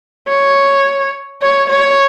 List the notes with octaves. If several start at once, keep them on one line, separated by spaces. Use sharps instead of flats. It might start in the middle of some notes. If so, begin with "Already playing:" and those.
C#5
C#5
C#5